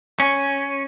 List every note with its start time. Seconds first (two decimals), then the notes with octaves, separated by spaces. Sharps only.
0.20 C#4